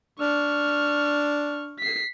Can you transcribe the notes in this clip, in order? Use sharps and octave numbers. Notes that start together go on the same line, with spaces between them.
D4 C#6 F6
B6 C7